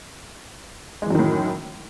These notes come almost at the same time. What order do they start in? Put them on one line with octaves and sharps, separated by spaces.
G#3 E3 F#2 D#3 A2